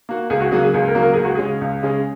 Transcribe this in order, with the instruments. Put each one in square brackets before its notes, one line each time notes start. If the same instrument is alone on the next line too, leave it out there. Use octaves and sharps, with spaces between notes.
[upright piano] A#3 F#4
[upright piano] C#2 [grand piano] G#4
[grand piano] F#4
[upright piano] C#3 F#3 A#3 F#4 [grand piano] G#4
[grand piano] G#4
[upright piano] C#2 [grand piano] G#4
[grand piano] A#4
[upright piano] C#3 F#3 A#3 F#4
[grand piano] A#4
[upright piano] C#2 [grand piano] G#4
[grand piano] F#4
[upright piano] C#3 G#3 C#4 [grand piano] G#4
[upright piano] C#2
C#3 G#3 C#4